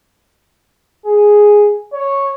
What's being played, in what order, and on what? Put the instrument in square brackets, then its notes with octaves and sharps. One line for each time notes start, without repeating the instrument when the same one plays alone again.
[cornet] G#4
C#5